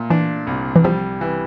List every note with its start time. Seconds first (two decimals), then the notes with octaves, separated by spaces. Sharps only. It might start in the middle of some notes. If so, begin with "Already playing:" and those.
Already playing: A#2 A3
0.10 E3 D4
0.47 C2
0.76 E3
0.84 F3 G3
1.21 E3